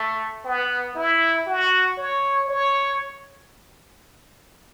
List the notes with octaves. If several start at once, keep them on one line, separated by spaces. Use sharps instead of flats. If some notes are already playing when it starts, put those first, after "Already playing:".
Already playing: A3
B3
E4
F#4
C#5
C#5